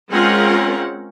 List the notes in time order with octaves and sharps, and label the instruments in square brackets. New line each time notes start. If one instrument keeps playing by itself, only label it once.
[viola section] G#3 C4 C#4 F4 A#4 F#5